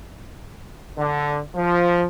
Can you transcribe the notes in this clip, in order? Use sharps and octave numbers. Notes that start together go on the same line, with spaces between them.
D3
F3